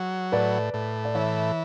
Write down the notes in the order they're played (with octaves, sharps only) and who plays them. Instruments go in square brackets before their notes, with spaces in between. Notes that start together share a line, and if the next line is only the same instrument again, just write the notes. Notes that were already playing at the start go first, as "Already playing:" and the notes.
Already playing: [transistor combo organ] F#3
[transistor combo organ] A2 [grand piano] B4 D5
[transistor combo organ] A2
[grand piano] D5
[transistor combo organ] E3 [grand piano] C#5 E5